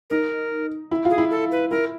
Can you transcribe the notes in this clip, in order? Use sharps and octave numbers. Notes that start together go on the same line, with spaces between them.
D#4 A#4
E4
F4
G#4
E4
A4
B4
E4 A#4